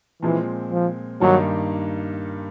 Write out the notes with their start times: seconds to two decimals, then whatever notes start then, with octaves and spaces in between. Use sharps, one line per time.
0.22 A#2 E3 F3 G#3 C4
0.72 F3
1.21 G2 D#3 F#3 G3 A#3 D#4